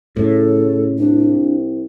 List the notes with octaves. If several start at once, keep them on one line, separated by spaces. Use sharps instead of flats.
A2 C#3 A4
C2 D4